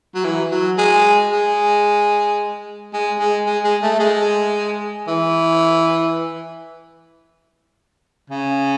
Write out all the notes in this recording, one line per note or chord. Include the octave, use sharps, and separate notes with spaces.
F#3
E3
F#3
G#3
G#3
G#3
G#3
G#3
G#3
A3
G#3
E3
C#3